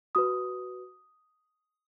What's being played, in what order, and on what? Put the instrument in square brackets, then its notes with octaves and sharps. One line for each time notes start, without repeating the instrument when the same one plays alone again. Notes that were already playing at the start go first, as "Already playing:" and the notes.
[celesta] F#4 B4 D#6